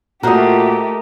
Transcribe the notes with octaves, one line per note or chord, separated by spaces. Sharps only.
A#2 A3 F#4 G4 A#4 C5 D#5